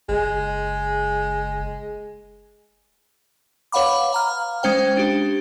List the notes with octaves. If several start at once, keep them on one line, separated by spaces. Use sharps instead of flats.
F#1 G#3
B4 C#5 F5 F#5 B5 D6
F5 A#5 F6
G#3 C#4 C5 G5
D4 G4